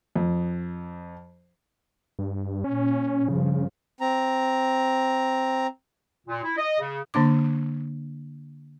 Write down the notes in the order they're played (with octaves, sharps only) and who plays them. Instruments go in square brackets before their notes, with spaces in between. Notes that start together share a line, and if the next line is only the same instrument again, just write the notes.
[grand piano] F2
[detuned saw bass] G2
[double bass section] A#2 [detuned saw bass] C#4
[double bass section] G2 F3 [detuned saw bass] C#3
[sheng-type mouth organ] C4 A#5
[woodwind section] A#2
E4
D#5
C#3
[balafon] D3 A#3 D4 D6